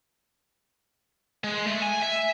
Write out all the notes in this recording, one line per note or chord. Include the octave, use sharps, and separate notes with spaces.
G#3
A3
G#5
E5